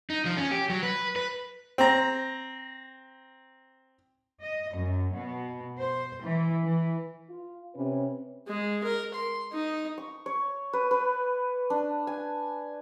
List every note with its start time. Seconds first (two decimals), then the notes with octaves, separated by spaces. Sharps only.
0.10 D#4
0.25 F3
0.37 C#4
0.51 G4
0.70 F#3
0.83 B4
1.16 B4
1.78 C4 A#5
4.41 D#5
4.75 F#2
5.15 B2
5.77 C5
6.23 E3
6.64 E3
7.30 F4
7.75 C3 C#4 B4
8.47 G#3
8.84 A#4
9.14 C6
9.52 D#4
9.98 C#6
10.26 C#5
10.73 B4
10.91 B4
11.70 D4
12.07 G#5